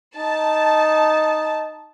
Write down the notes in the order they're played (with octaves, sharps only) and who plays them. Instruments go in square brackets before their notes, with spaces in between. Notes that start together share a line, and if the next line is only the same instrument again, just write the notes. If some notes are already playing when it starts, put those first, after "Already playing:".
[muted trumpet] D#4 [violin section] A5